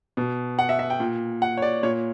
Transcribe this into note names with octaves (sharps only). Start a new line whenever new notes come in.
B2
F#5
E5
E5
G5
A#2
F#5
C#5
D5
A#2 C#5